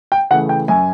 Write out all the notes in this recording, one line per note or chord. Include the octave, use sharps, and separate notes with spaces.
G5
C#3 E3 A3 F#5
G5
F#2 G#5